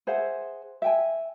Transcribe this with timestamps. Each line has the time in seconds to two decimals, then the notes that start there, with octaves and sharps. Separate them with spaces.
0.07 G#4 C5 E5 F#5
0.82 E5 G5 G#5